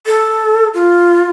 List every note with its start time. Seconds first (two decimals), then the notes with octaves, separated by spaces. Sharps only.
0.06 A4
0.74 F4